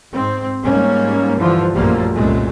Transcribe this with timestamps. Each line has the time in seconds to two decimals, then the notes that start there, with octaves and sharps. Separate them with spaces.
0.12 G#2 C4
0.63 G#2 G3 A#3 C#4
1.36 G2 D3 E3 F3
1.75 A#1 F#2 F3 G3 A3 A#3
2.14 C2 F#2 A#2 G#3 A3